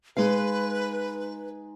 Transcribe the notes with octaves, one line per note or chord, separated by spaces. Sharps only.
G#3 D#4 B4 F5